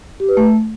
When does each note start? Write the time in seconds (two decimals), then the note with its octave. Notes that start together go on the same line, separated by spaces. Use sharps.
0.20 G4
0.29 B4
0.37 A3